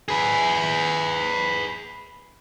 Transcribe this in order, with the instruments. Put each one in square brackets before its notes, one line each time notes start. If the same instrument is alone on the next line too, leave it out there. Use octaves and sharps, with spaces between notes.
[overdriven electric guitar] G#4 B4